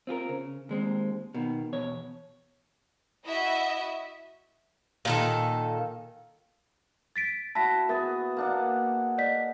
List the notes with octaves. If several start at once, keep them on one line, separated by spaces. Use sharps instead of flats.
C4 F4 G4 A#4
C#3
D#2 G#3 C4
B2 D#3
E2 B2 C#5
E4 F#4 D#5 E5
A#2 D#3 A4
A6 B6 D7
E4 F#4 A5 A#6 B6
B3 G#4 A#4 E5 A6
A#3 D4 F#5
D5 D#5 B6